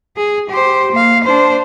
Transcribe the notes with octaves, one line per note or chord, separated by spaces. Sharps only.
G#4
G4 C5
A#3 F5
D4 C5